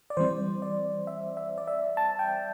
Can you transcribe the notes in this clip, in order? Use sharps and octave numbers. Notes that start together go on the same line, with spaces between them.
D5
E3 G3 C4 C5
D5
E5
E5
D5
E5
A5
G5